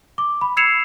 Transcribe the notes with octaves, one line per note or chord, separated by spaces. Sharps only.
D6
B5
E6 G#6 C7 C#7 E7 F7